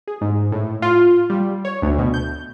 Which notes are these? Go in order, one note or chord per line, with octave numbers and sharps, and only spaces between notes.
G#4
G#2
A2
F4
G3
C#5
D2
B2
G6